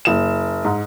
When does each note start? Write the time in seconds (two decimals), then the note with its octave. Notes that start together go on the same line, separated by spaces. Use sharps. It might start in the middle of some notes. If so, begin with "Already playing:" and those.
0.05 F#1 E7
0.65 G#2